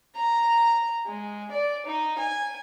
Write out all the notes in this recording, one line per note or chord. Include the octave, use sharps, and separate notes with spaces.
A#5
G#3
D5
D#4
G#5